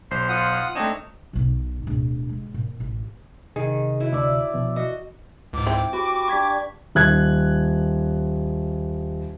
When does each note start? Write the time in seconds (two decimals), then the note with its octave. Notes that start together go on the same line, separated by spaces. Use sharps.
0.11 B1 C5
0.29 F4 F#5 D#6
0.75 A3 C4 D4 D#4 C#5 E7
1.33 B1 B2
1.87 D1 B2
2.29 G#3
2.54 A#2
2.80 A1
3.56 C3 D#3 G#4
4.00 F#3 E4
4.12 D2 D5 E5
4.54 B2 F3
4.76 F#4 D#5
5.53 C#2 G#2 D6
5.66 C4 E4
5.93 F#4 G4 B4 C#6
6.28 D4 G4 F5 C#6 G#6 B6
6.95 D#1 F#6 G#6